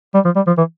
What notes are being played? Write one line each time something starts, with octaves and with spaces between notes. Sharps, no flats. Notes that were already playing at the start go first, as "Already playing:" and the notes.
G3
F3
G3
F3
E3